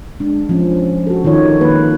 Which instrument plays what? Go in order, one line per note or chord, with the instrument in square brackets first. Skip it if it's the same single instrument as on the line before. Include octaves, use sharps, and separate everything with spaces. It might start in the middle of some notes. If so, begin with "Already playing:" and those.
[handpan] G#3 D4
F3 C#4
F#4 A4
D#3 D#4 F4 C#5
D#3 G#3 A#3 B4